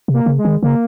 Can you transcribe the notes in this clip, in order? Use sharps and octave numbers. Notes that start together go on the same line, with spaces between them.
C3
A#3
C#3
G#3
D#3
C#3 A#3